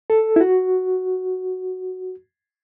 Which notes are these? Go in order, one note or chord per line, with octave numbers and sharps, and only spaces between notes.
A4
E4
F#4